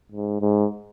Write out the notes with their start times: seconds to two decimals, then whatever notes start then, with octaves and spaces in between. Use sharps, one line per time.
0.12 G#2
0.41 G#2